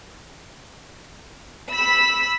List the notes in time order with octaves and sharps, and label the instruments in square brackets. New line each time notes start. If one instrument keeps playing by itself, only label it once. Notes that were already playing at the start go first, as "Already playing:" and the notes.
[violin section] B5 E6 B6